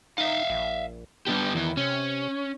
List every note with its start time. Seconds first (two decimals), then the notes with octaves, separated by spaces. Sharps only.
0.18 D#4 E5 F5
0.50 A#1
1.27 G3 B3 D4 G4
1.55 E2 D#3 E3
1.77 C3 C#4